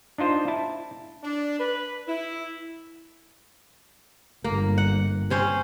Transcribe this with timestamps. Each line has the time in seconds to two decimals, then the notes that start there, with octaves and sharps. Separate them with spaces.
0.18 D4 D#4 F4 C5
0.48 E4 A5
1.23 D4
1.59 B4
2.08 E4
4.44 G1 A#3
4.78 F#5
5.30 C4 C#4 C5